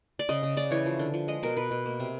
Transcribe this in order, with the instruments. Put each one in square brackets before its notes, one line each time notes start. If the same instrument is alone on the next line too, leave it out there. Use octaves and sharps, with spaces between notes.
[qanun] D5
C#3 D#5
C#3
C#3 D5
E3 C#5
F3
D3
F3
G#3 D#5
B2 A#4
B2 B4
B2
A#3
C3